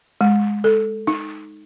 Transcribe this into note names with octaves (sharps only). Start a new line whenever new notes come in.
G#3
A4
D#4